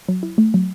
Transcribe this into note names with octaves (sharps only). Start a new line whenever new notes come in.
F#3
E4
A3
F#3